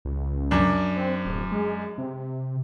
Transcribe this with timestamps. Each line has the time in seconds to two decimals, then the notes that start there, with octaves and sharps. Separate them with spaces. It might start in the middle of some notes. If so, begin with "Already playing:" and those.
0.05 C#2
0.51 F#2 D4
0.96 C4
1.25 D1
1.51 G#3
1.98 C3